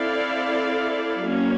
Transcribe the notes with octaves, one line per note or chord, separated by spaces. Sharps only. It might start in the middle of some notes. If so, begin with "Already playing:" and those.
Already playing: C4 E4 A4 D5 F5
F#3 A#3 C#4